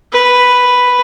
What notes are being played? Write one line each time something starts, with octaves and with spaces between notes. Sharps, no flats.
B4